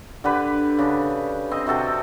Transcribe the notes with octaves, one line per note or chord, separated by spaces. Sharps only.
D3 G4 B4
C#3 D4
C4 D#5
C3 F#4 A4 G5